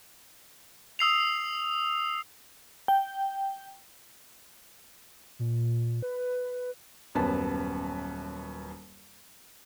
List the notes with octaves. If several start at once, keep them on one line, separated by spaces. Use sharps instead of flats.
D#6 E6 C7 F7
G5
A#2
B4
D#1 F#2 B3 A5